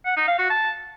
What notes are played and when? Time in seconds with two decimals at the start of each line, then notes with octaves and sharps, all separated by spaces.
0.06 F#5
0.17 D#4
0.28 F5
0.39 F#4
0.50 A5